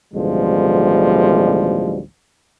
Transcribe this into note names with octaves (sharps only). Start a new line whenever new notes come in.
A1 D2 B2 F3 G3 G#3